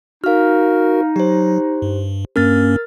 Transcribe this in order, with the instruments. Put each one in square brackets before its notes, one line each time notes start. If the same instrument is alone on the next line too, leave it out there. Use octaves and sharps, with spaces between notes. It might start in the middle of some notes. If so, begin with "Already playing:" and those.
[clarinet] D#4 [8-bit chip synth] F#4 A#4 [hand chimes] F5 F6
[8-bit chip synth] F#3 [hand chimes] G4 C5
[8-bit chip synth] G2
[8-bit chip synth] G2 A#3 C#4 [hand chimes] A#4 F6 A6